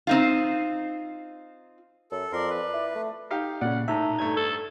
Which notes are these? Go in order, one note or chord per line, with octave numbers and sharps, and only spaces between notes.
C4 D#4 F4
F#2 A4
F2 A#4 D5 C6
B4
E4
A3
D#4 G4 F5
A#2 C#3 D5 F#5
A2 D#4 E5
G2 A3 G#6
A4